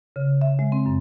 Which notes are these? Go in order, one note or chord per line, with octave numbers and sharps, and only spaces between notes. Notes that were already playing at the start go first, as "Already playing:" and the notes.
C#3
E5
G#3
C4
F#2